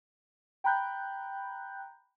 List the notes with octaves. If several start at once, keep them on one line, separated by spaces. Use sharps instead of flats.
G5 A#5 B5 F#6 G6